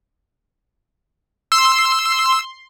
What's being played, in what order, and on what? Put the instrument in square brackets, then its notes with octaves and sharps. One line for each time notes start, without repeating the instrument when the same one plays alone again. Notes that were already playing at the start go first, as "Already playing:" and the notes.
[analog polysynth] C6 [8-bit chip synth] E6